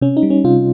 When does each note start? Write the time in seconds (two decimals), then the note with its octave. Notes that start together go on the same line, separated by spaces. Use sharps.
0.01 C3 C#4
0.17 D#4
0.23 G3
0.30 C#4
0.44 C3 F4